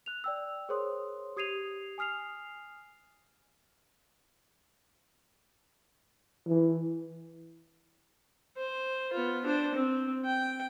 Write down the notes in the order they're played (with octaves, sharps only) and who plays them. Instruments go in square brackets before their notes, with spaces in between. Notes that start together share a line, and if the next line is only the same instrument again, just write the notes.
[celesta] F#6 F7
D5 G5 E6
G#4 A#4 C5 C#5 C6 D#6
G4 D#6 G#6 C7 D#7 F7
G#5 D#6 F6 C7 F7
[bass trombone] E3
[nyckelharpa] C5
B3 F4
D4 C5
C4
G5